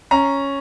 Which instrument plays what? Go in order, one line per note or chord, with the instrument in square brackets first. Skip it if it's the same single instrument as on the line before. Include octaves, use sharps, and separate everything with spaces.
[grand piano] C#4 A#5